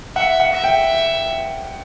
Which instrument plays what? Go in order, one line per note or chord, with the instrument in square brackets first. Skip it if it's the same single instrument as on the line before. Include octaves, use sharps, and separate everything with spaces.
[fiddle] E5 [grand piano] F#5
[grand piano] F#5
[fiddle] E5
[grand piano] G5